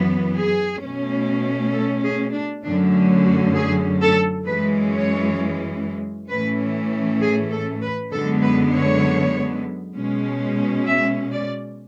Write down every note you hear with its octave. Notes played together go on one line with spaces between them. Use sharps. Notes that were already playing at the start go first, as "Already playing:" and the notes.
Already playing: F#2 E3 B3
G#4
B2 A3 C#4
A4
G#4
D4
F#2 D3 A3 C#4 D4
F#4
G#4
A4
F#2 E3 G#3 C#4 B4
C#5
A2 E3 A3 C#4 B4
G#4
A4
B4
F#2 D3 G#3 B3 A4
B4
C#5
B2 G#3 C#4
E5
D5